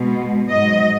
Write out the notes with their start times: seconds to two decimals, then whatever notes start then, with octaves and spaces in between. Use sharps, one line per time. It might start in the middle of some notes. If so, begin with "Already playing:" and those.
Already playing: B2 G#3
0.49 G#2 F#3 D#5